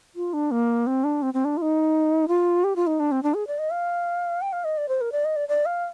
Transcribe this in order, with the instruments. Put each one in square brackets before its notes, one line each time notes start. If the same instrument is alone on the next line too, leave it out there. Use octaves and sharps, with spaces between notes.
[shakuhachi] F4
D4
A#3
C4
D4
C4
C4
D4
F4
D#4
F4
G4
F4
D#4
D4
C4
D4
G#4
D5
D#5
F5
G5
F5
D#5
D5
C5
A#4
D5
D#5
D5
D5
F5